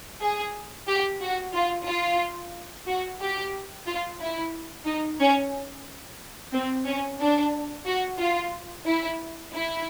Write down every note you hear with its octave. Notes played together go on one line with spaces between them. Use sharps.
G#4
G4
F#4
F4
F4
F#4
G4
F4
E4
D#4
C#4
C4
C#4
D4
F#4
F4
E4
E4